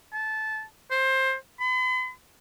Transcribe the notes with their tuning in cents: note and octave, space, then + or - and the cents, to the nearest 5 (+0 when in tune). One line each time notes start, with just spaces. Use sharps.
A5 -15
C5 +20
B5 +45